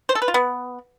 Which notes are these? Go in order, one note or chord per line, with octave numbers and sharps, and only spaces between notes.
C5
A4
B4
F4
B3